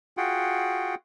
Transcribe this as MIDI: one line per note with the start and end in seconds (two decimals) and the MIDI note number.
0.17 0.95 65
0.17 0.95 66
0.17 0.95 68
0.17 0.95 78
0.17 0.95 79